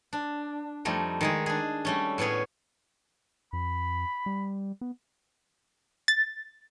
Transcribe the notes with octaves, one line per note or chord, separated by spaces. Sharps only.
D4
F2 G3 A3 D#4
D#3 G#3 G#4
D4 G#4
G3 A3 C#4
A2 B3 C#4 G#4 C#5
F2 B5
G3
B3
A6